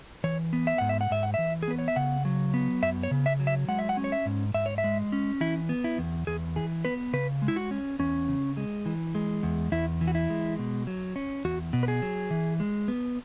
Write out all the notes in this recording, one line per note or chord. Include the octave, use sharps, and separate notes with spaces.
E3 C#5
B3
E5
G#2 F#5
E5
F#5
G#2 E5
F#5
E3 E5
G#4
B3 B4
C#5
E5
C#3 F#5
F#3
B3
F#2 E5
C#5
C#3
E5
F#3
E5
G#3 F#5
E5
F#5
C#4
C#5
E5
G#2
G#2 E5
C#5
E5
G#3
C#4
E3 E4
B3
E4
E2
E2 G#4
E3 G#4
B3 B4
C#3 B4
G#3
E4
F#4
C#4
E2 C#4
C#3
G#3
E3
G#3
E2
E2 E4
E3
F#4
E4
G#3
B2
F#3
C#4
E2 F#4
B2
B4
G#4
F#3
E3
G#3
B3